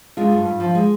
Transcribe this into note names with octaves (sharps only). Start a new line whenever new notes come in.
G#3 D4 F4
G2
G2
F3
G#3